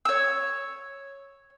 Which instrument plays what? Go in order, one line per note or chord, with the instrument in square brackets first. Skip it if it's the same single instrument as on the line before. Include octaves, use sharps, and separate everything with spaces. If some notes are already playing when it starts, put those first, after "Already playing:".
[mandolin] C#5 E6